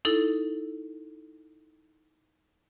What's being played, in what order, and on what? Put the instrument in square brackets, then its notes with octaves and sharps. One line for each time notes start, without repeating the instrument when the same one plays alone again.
[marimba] D#4 E4 A4